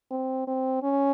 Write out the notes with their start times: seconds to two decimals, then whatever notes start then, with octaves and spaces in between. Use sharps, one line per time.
0.11 C4
0.47 C4
0.83 C#4